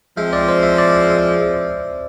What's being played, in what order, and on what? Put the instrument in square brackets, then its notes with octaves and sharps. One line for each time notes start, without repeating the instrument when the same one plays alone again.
[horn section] F3 G#3 C4 [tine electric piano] E5
[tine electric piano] D5
C5
E5
D5